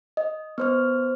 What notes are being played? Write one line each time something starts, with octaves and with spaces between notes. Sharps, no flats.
D#5
B3 C5 F6